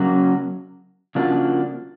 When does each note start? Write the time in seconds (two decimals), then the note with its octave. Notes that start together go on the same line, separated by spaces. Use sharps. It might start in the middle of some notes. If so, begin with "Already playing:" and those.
Already playing: C#3 F#3 A#3 C#4 F#4
1.15 C#3 F3 A#3 D4 F#4